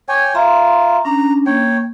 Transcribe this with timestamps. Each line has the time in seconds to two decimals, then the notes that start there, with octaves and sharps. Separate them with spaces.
0.09 C#5 G5 G#5 D6
0.35 F4 E5 A#5 C6
1.05 C#4 D4 A#5
1.46 A#3 C#5 G5